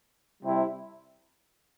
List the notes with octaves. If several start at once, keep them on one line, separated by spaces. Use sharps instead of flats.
C3 G3 C4 E4